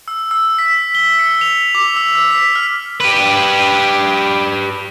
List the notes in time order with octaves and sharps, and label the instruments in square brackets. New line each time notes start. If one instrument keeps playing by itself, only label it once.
[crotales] E6
E6
B6
G7
C#7
F7
D6
E6
E6
B6
F6
[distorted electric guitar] G4 B4